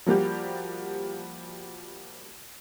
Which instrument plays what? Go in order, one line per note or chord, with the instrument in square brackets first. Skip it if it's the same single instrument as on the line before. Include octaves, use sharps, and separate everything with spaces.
[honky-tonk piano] F3 G3 A#3 F#4 G4